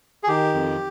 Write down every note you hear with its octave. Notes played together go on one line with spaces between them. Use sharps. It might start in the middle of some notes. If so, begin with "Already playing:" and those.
G#4
D#3 G4
F2